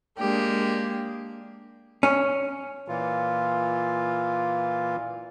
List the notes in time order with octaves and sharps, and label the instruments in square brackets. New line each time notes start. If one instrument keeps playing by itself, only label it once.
[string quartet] G#3 A#3 D4 G4
[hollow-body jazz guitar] C#4
[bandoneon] A#2 E3 F4